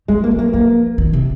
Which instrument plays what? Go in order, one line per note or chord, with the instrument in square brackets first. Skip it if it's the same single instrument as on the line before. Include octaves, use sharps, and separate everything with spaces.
[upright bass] D#3 [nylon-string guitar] G#3
[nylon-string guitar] A#3
[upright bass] F#3
[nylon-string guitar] A#3
[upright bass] F3 [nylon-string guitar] A#3
[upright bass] D#3
C3